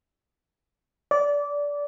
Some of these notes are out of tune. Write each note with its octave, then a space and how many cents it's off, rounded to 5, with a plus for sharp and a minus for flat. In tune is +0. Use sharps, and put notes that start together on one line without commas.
D5 -20